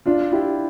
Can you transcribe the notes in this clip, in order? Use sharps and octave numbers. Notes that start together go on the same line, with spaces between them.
D4 F4
E4 G4